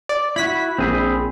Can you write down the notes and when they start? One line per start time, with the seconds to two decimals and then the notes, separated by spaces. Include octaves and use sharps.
0.09 D5
0.36 E4 F#4 B5 B6
0.78 A#1 C4 G#4 B5